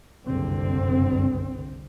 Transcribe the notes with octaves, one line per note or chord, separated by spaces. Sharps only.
F#1 C2 G2 D3 C4